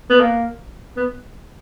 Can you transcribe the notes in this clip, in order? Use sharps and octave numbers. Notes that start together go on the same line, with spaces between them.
B3
A#3
B3